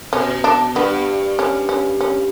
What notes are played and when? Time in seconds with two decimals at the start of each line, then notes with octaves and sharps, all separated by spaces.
0.13 B2 C#4
0.44 D4
0.75 G2 B3
1.39 C#4
1.69 C#4
2.01 C#4